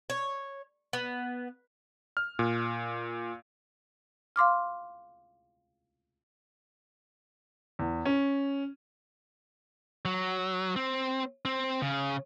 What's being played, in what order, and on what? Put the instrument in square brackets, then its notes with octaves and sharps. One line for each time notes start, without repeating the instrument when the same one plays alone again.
[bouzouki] C#5
B3
[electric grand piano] F6
A#2
[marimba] F5 C6 D6 F6
[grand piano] E2
C#4
[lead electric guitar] F#3
C4
C4
C#3